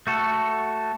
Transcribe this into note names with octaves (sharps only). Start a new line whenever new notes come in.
A3 F#4 A4